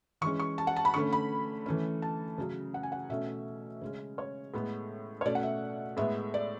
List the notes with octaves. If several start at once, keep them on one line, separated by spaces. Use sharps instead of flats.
E3 G#3 C#4 C#6
C#6
A5
F#5
A5
B5
D3 A3 C#4 C#6
B5
E3 A3 C#4
A5
C#3 F#3 C#4
F#5
G#5
F#5
B2 A3 C#4 E5
C#3 G#3 C#4
C#5
A2 G#3 B3
C#5
B2 A3 C#4 D5
F#5
E5
A2 G#3 B3 E5
D5